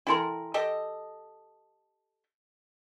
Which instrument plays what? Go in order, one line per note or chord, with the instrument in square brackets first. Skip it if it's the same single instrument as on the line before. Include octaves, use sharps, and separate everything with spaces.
[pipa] E4 A4 A#4 [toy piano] G5 G#5 C6
[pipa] G4 A4 D#5